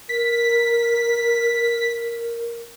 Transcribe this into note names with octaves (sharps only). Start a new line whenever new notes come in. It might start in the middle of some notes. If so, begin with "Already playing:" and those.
A#4 B6